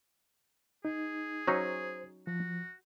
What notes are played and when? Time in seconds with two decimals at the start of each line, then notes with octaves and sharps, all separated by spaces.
0.85 D#4 G#4
1.47 F#3 C#4 D#4 C5
2.27 F3 F#4